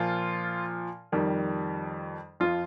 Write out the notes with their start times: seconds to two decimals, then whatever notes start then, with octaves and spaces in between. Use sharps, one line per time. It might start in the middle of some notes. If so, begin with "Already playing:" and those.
Already playing: A#2 F3 F4
1.12 F2 D#3 G3
2.40 F2 F3 F4